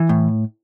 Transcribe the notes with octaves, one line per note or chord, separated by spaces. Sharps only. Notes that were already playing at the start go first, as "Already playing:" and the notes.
Already playing: E3
A2